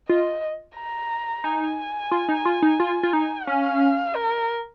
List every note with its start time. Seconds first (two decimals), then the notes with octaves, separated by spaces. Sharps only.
0.09 F4 D#5
0.77 A#5
1.44 D#4 G#5
2.11 F4
2.28 D#4
2.45 F4
2.62 D#4
2.80 F4
3.03 F4
3.13 D#4
3.47 C#4 F5
4.16 A#4